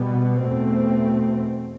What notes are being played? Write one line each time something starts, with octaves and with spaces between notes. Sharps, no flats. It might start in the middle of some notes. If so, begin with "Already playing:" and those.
Already playing: B2 G3 B3
E2 B2 A3 C4